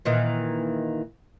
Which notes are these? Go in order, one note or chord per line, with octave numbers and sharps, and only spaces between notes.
A#2 D#3 E3